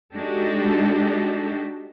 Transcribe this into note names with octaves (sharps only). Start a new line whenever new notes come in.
G#3 D4 D#4 F#4 G4 A4